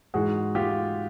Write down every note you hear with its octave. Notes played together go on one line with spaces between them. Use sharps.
G#2 E3 G#3 F#4 G#4
F4 G4